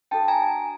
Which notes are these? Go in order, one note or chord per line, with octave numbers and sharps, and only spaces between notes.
D4 F#4 A4 G5 A5
G#5 A#5